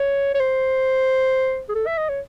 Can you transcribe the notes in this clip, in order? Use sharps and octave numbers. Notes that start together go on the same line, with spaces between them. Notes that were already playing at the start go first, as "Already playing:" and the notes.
Already playing: C#5
C#5
C5
G#4
A4
E5
D#5
C#5